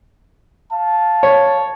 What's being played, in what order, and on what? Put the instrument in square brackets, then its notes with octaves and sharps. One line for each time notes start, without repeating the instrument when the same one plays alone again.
[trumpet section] F5 A5
[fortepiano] C#5